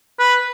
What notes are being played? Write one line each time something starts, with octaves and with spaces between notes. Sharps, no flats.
B4